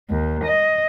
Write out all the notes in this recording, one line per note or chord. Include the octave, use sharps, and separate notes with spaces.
D#2
D#5